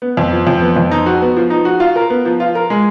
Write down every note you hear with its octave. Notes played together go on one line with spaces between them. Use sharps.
B3
F2
F3
F2
B3
F2
D#4
F#4
B3
F3
D#4
F#4
F4
A#4
B3
F3
F4
A#4
G#3